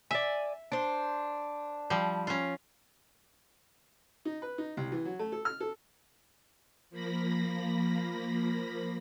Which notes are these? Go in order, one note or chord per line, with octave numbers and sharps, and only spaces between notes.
D5 E5 G#5
D4 C5
F3 G3
C#4 F4
D#4
B4
D#4
C2
E3
F#3
A3
A4
F6
A4
F3 A#3 B5 A#6